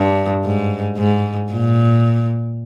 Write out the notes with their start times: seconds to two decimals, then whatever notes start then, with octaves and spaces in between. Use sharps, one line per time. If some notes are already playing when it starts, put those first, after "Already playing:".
Already playing: G2
0.44 G#2
0.98 G#2
1.51 A#2